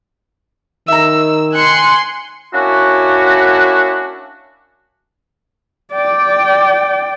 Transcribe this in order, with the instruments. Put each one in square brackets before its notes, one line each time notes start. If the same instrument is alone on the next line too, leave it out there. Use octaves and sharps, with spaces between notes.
[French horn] D#3 [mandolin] E5 A#5 [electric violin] E6
[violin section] G#5 C6 [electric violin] F#6 C#7
[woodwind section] A#3 C#4 D4 E4 F#4
[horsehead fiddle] D5 G5